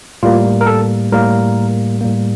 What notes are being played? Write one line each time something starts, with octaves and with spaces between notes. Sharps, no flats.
A2 G3 A#3 F4
A#4
A4
A2 G3 A#3 A#4
A2 G3 A#3